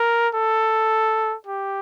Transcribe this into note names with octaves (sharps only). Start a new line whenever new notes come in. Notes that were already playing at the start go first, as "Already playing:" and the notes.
Already playing: A#4
A4
G4